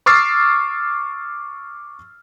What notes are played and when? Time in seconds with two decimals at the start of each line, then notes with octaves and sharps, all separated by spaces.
0.06 C#6 D6 E6 F6 A6 C7